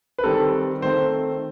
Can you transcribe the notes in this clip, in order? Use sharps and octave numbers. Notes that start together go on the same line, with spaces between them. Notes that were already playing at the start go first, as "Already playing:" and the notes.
B4
D#3 G3 C4 A4
D#3 A3 C4 C5